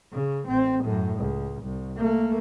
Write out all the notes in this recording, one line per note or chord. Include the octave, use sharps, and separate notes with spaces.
C#3
A1 C4
F#2 A2
C#2
C2
A3 A#3